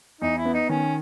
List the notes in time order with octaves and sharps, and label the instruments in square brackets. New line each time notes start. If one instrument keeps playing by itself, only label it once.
[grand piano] E2 [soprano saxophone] D#4
[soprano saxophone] E4
[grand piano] B3
[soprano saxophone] D#4
[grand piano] D#3 [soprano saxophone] C#4